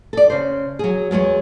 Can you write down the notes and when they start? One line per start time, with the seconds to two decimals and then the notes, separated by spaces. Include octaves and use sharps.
0.13 A4 D5
0.30 C#3 C5
0.79 F#3 G#4
1.11 E2 F#3 G#3 C#5